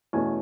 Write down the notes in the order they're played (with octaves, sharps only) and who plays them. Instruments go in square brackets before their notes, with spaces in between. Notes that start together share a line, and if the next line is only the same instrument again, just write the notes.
[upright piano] E2 B2 A3 C#4 G#5